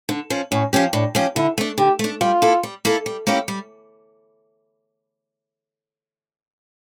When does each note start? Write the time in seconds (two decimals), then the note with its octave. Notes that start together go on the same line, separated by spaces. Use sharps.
0.09 D3
0.30 F3 C#4
0.51 A2 C#4
0.73 F3 C#4 G4
0.93 A2 D4
1.15 F3 C#4 G4
1.36 D3 E4
1.58 A3 D4
1.78 D3 G4
1.99 A3 D4
2.21 G3 F4
2.42 A#3 E4 A4
2.63 G3
2.85 A#3 E4 A4
3.06 G3
3.27 A#3 C#4 E4 G4
3.48 G3